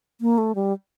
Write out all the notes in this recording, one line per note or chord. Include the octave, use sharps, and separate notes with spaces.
A#3
A3
G3